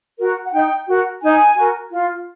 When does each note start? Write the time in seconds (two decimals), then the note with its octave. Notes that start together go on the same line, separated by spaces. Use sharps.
0.19 F#4 A#4
0.44 F#5
0.53 D#4 G5
0.87 F#4 A#4
1.21 D#4 G#5
1.56 F#4 A#4
1.90 F4